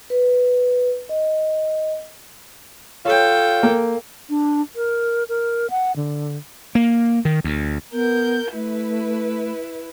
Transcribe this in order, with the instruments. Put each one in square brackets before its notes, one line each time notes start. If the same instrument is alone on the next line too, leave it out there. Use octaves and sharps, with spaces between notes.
[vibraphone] B4
D#5
[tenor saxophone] F4 [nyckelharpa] A4 G5 [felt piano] C#5
[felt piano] A#3
[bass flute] D4
A#4
A#4
F#5
D3
[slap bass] A#3
D#3
D2
[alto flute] B3 [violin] A#4 G6
[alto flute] A3 [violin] E4 B4